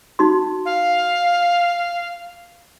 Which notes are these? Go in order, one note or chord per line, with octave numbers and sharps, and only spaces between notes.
D#4 F#4 C6
F5